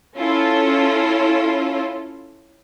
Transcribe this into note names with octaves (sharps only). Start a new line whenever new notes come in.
C#4 E4 F4 A4